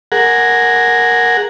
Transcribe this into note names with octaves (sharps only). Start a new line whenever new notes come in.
G#4 A#4 F#5